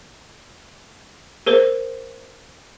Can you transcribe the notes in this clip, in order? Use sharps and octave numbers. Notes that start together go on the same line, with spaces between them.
G#4 A#4 C5